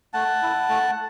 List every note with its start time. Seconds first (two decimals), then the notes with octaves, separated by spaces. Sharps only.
0.13 A3 F#5 A5
0.42 E4
0.69 A3